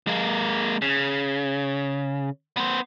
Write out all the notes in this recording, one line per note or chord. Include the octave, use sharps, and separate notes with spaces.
G#3 A#3
C#3
B3 C5